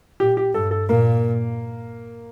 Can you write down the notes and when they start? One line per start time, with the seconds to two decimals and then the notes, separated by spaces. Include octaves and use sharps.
0.20 A#2 G4
0.37 G4
0.54 G2 A4
0.71 A4
0.89 A#2 A#3